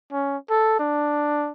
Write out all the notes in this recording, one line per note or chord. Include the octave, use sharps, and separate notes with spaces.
C#4
A4
D4